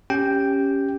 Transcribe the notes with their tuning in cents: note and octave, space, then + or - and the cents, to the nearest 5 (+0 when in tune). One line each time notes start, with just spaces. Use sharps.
C#4 +0 G4 +0 G5 +0